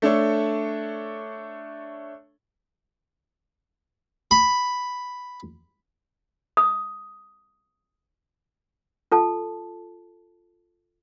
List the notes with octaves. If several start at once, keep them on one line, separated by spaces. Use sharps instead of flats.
A3 D4 A4 C#5
B5
D#6
F4 A4 A5